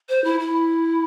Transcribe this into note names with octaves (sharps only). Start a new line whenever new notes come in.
C5
E4
E4